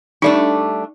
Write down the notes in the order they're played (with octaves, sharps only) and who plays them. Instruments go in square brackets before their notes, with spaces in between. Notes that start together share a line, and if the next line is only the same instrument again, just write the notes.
[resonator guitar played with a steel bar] G3 A3 D4 [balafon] D#4 D5